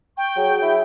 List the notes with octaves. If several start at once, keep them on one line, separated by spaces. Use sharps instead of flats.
G5 C#6
F#3 G#4
E4